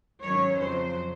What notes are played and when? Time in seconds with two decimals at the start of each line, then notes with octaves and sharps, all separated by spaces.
0.21 G#2 D#3 F#3 C#4 C#5
0.58 F2 C#3 F#3 C5